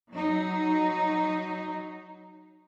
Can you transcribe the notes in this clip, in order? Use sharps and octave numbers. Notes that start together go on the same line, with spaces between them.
F#3 D#4